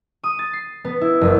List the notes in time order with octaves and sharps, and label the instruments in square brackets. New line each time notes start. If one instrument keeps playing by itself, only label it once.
[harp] D#6
A6
C7
B3
E4
F#1